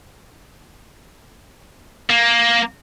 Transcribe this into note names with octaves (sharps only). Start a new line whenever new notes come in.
A#3